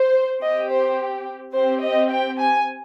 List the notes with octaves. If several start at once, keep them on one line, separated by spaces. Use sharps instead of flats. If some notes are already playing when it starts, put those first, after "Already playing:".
Already playing: C5
C4 G4 D#5
C5
C4 G4 C5
D#5
G5
G#5